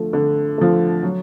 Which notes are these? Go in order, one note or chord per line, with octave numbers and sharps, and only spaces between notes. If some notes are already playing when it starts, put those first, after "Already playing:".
Already playing: D3 F3 A3
D3
F3 A3
F#3